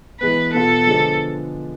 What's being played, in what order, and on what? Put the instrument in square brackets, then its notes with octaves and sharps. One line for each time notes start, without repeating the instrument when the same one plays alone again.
[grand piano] E3 G#3 B3 [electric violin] B4
[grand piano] B2 B3 F4 [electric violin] A4
[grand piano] D3 F3 G#3 B3 D4